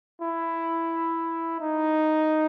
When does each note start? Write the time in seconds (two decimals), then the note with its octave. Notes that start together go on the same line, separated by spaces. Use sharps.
0.21 E4
1.60 D#4